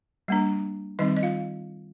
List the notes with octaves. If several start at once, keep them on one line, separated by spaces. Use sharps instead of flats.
G3 A#3 D4
D#3 G3 C4 D#4 D#5
D#5
F4 F5